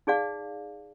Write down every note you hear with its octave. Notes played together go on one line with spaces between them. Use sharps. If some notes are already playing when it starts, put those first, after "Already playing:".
D#4 G#4 D5 F5